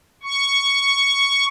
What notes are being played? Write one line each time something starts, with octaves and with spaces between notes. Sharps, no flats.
C#6